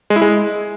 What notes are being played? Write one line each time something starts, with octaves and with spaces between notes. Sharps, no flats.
G#3
E4
G#3